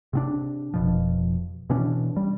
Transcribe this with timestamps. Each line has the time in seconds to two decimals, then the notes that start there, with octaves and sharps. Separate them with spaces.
0.13 C3 C4 D4
0.74 F1 B2 F3
1.70 B2 E3 C#4 D4
2.16 G3